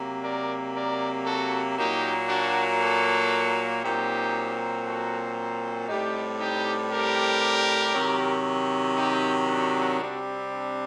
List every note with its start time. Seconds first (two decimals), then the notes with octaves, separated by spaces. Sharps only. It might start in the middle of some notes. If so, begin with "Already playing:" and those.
Already playing: C3 F#3 A#3
0.23 A#4 D5
0.75 A#4 D5
1.26 F#4 A4
1.78 A#2 F#3 A#3 D#4 G4
2.29 D4 F#4
2.81 F#4 A4
3.83 A#2 F#3 C4 D#4 G4
4.86 F#4 A4
5.89 A2 G3 C4 D#4 G4
6.41 D#4 G4
6.92 G4 A#4
7.94 C3 D#3 F#3
8.97 D#4 G4
9.48 D4 F#4
10.00 C3 G3 C4
10.51 D4